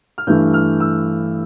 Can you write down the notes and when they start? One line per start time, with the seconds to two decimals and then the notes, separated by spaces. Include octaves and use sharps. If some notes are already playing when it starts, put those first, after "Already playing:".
0.18 F6
0.27 G2 E3 A3 G6
0.54 F6
0.80 E6